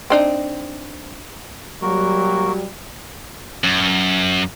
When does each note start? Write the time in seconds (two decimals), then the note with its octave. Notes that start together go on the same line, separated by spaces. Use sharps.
0.10 C4 D4 D#4
1.82 F#3 G3 A#3 F#4 A#4
3.64 F#2